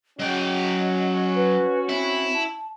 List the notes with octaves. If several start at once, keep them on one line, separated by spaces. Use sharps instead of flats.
F#3 C#4 F#4 D#5 G5
B4
C4 E4
A5